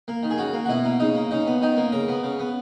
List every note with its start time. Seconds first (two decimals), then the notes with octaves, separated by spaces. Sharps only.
0.08 A#3
0.23 D#3
0.30 G#4
0.38 C#3 F#4
0.53 A#3
0.65 F#4
0.69 B2 E4
0.85 A#3
0.99 C#3 D#4
1.15 A#3
1.31 C#3 D#4
1.47 B3
1.62 D#3 D#4
1.77 A#3
1.92 C#3 A#4
2.08 B3
2.23 C#3
2.39 B3